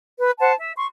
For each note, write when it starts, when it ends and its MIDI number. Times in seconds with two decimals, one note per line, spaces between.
0.19 0.31 71
0.39 0.53 72
0.39 0.53 78
0.39 0.53 81
0.58 0.72 76
0.77 0.85 84
0.77 0.85 85